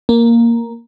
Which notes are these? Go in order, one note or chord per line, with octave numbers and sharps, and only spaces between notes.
A#3